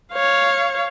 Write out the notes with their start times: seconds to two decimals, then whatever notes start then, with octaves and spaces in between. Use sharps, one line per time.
0.13 C#5 F5